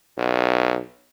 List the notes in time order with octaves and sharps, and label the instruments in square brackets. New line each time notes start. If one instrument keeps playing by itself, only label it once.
[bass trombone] B1